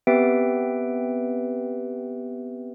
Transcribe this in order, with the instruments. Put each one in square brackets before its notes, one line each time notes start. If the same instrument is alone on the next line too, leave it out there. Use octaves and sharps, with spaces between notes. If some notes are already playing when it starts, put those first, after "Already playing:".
[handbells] B3 C4 G4 B4 E5 D7